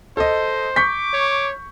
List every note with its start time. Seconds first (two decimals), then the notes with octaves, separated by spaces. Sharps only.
0.17 A4 C5 D#5
0.76 C#6 D6 G6 B6
1.13 C#5